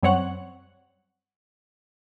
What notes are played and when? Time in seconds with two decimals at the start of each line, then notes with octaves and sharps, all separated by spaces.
0.03 F#2 G3 C4 C#5 F#5 F#6